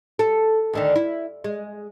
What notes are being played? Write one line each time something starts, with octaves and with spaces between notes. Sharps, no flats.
A4
D2 D3 D#3
E4
G#3